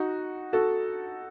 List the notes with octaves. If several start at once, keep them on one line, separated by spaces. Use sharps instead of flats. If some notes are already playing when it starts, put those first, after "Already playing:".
Already playing: D#4 F#4
F#4 A4